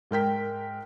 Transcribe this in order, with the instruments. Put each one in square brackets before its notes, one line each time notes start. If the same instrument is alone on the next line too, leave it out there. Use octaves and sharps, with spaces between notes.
[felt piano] G#2 A#4 G5 B6